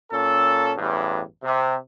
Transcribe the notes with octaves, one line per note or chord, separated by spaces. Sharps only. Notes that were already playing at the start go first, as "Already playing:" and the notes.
A#2 C#4 A4
A1 E2 G2
C3